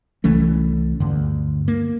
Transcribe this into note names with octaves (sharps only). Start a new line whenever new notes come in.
C2 E3 A3 C#4
D2 G2 D3
A#3